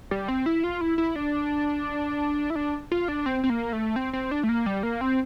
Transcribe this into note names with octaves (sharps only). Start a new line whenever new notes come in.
G3
C4
E4
F4
E4
E4
D4
E4
D4
F4
D4
C4
C4
A#3
A3
C4
C4
D4
A3
A#3
G3
A#3
C4